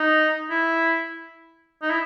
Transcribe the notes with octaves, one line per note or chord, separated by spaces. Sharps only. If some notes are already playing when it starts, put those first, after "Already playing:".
Already playing: D#4
E4
D#4
E4